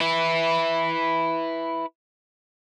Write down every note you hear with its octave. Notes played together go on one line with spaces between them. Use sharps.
E4 B4